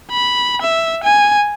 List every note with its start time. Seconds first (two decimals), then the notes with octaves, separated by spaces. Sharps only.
0.11 B5
0.62 E5
1.04 G#5